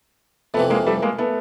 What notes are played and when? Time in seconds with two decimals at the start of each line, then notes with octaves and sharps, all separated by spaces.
0.54 F2 A3 B3
0.57 C3 E3
0.70 G#3 A#3
0.87 G3 A3
1.02 G#3 A#3
1.18 A3 B3